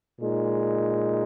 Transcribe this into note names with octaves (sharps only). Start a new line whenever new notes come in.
A#2 G#3 D#4